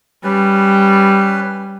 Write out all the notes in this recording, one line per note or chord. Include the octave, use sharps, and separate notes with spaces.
G3 C#4 B4